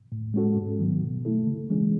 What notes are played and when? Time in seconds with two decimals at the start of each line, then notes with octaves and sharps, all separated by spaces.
0.12 A2
0.34 G#3 C#4 F#4 A4
0.57 G#2
0.79 D#3 F#3 B3
1.02 B2
1.25 A3 E4 A4
1.47 C#3
1.69 E3 G#3 C#4 G#4